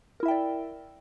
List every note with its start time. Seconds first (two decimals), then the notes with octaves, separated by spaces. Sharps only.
0.20 A#4
0.23 E4
0.26 E5
0.28 G5
0.31 D5